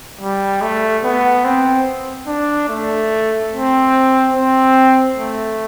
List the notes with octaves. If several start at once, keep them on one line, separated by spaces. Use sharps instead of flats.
G3
A3
B3
C4
D4
A3
C4
C4
A3